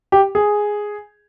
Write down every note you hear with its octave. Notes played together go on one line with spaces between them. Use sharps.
G4
G#4